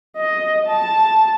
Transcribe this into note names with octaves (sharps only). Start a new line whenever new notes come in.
D#5
A5